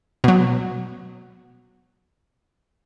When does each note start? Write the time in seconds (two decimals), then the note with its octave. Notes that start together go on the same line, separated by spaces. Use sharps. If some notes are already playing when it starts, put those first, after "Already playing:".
0.24 B2 F#3